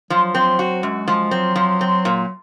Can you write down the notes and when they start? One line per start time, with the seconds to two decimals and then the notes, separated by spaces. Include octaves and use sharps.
0.10 F3 F#3
0.35 C4
0.59 F#4
0.83 F#2 G#3
1.08 F3 G#3
1.31 F#3 C4
1.56 F3
1.81 C4
2.05 A#2